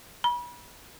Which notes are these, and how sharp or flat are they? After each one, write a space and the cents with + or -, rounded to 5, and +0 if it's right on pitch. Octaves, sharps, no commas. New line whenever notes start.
B5 -35